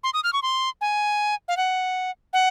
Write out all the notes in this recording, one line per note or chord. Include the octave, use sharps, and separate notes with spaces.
C6
D#6
F6
C#6
C6
G#5
F5
F#5
F#5